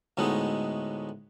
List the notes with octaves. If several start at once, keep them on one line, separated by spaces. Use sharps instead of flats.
D2 A2 G#3 B3 D#4